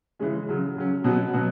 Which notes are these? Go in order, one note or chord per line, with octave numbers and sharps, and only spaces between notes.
C#3 E3 G#3 C#4
C#3 F#3 C#4
C#3 F#3 C#4
B2 F#3 B3 F#4
B2 F#3 B3 F#4